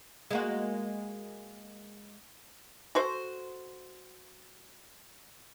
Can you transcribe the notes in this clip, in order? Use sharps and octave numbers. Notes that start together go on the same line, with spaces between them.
G#3 A#3 F#4
F#4 A4 C5